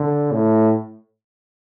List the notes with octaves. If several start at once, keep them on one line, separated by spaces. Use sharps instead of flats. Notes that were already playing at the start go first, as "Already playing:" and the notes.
Already playing: D3
A2